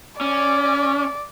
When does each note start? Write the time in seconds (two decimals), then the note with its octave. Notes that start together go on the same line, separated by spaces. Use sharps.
0.21 C#4 D5